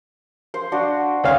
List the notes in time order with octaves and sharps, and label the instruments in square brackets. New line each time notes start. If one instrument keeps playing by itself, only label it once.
[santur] C5
D4 F#4
[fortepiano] D2 C#4 F5